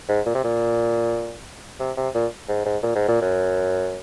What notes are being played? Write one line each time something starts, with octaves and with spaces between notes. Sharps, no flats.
G#2
A#2
C3
A#2
C3
C3
A#2
G#2
G#2
A#2
G#2
A#2
F#2